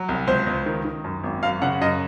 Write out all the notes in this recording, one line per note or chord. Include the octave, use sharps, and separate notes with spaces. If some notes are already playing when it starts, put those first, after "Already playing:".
Already playing: F#3
C2
C#2 C5
C#2
D#3
D#3
F#2
G#1
F#2 F5
C#3 F#5
F#2 D#5